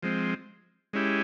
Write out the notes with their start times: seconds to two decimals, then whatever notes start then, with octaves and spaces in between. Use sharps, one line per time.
0.03 F3 G#3 C4
0.93 G#3 C#4 E4 G4